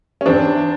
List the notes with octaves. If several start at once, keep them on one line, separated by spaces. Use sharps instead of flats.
C#4
E2 C4 D4